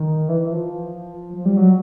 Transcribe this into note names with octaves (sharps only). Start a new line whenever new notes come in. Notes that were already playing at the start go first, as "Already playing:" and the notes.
Already playing: D#3
E3
E3
F3
F3
G3
F#3